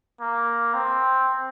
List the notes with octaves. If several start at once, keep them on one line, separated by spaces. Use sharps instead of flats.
A#3
C4